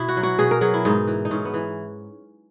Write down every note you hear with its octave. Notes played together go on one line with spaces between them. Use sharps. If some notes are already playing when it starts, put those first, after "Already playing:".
Already playing: B2 E4
F#4
F#3
F#4
B2 G#4
A#4
F#3 G#4
E4
G#2 D#4
E3
D#4
G#2 C#4
B3
E3